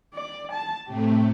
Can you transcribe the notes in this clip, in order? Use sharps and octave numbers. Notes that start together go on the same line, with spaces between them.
D5
A5
A2 C3 A3 G4